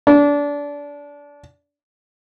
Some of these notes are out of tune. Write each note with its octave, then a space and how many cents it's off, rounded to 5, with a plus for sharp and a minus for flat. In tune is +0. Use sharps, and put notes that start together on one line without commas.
D4 -25